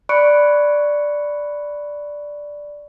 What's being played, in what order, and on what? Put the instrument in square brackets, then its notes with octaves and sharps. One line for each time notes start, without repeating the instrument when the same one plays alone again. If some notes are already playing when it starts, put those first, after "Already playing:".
[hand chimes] D5 B5 C#6 F#6 C#7 D7